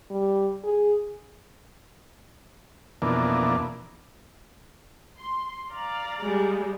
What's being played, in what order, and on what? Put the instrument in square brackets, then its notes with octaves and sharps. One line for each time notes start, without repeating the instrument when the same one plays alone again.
[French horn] G3
G#4
[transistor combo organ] F2 B2 E3 A#3 D4
[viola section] C6
D5 F5 A#5
[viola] G3 G#3